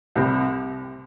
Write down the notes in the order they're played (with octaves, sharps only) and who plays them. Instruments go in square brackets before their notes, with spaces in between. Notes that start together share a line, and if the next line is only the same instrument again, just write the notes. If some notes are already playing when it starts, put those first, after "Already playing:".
[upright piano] C2 C3 G3 C4